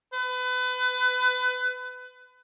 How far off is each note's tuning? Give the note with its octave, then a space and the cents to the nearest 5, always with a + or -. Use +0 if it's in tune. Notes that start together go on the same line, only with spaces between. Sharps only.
B4 +30